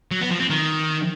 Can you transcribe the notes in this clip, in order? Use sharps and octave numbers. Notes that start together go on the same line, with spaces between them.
F#3
B3
F3
C4
D#3